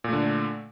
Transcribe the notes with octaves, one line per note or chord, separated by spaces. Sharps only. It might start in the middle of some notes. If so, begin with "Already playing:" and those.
A#2 D3 A3